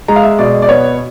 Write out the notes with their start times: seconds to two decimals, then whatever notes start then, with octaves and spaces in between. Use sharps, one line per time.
0.08 G#3 A#5
0.16 F5
0.23 E5
0.39 B2 D5
0.62 D5
0.69 B3 C#5